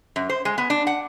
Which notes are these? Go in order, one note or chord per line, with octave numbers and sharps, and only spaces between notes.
F#2
C5
G#3
B3
D4
F#5